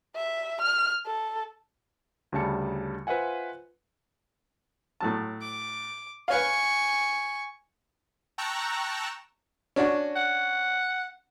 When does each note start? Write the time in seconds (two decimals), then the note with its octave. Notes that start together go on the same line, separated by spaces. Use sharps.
0.16 E5
0.62 F6
1.07 A4
2.32 D2 C#3 G3 A5 C#7
3.07 F4 B4 C5 E5 F#5 G#5
5.00 A2 F#3 A5
5.41 D6
6.28 B4 C#5 F5 G#5 C#6
8.38 G5 A5 A#5 C#6 E6 F#6
9.76 C#4 D4 F#4
10.16 F#5